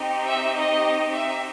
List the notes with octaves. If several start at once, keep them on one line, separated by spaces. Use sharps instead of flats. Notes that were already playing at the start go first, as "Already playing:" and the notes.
Already playing: C4 D#4 G4
E5
D#5
E5